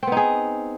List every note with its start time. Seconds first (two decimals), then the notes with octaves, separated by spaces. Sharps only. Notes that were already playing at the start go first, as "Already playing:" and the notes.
0.03 C4
0.07 B3
0.12 D#4
0.17 G#4